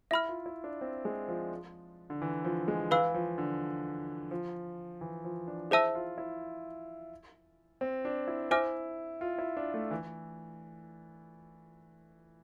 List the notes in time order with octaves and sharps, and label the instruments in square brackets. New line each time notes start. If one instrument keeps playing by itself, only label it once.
[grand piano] E4 [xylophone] E5 B5 F6
[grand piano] F4
E4
D4
C4
G#3
F3
D3
E3
F3
G#3
[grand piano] E3 [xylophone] B4 F5 B5 E6
[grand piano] F3
D3
F3
E3
F3
D4
[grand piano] E4 [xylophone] G#4 C5 E5 A5 E6
[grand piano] F4
E4
C4
D4
E4
[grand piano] E4 [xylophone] C5 E5 G#5 D6 F6
[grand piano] F4
E4
D4
A3
E3